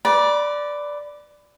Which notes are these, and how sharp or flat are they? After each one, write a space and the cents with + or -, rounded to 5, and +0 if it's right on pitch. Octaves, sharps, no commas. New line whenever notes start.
B4 +20 D5 +0 B5 -45